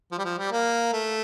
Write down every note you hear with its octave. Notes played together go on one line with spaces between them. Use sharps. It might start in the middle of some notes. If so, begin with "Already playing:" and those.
F3
G3
F3
G3
A#3
A3